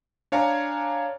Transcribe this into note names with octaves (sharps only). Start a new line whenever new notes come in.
D4 C#5 F5 G#5 A#5